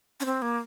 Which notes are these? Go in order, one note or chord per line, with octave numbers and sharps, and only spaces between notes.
C#4
C4
A#3